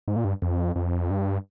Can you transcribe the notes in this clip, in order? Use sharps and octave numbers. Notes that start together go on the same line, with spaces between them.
G#2
A#2
G2
F2
F2
G2